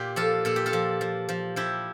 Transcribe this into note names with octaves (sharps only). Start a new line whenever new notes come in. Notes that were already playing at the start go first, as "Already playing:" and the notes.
Already playing: A#2 G4
F3 F4 A4
A#2 A4
G4
F4 A4
F3
F3
F3
F3 E4 G4